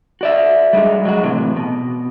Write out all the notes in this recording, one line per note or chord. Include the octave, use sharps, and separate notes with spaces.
F#4 D5 E5
G3 G#3 D4 D#4
F#3 G#3 F#4
A2 C3 E3
B2